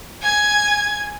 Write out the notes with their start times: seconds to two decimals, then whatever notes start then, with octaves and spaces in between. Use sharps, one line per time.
0.21 G#5 G#6